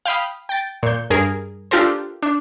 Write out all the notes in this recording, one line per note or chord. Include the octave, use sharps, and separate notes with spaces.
F5 G5 B5 D#6
G5 A6
A#2 G6
G2 G#4 A#4
D4 F4 G4 A4 A#4 C5
D4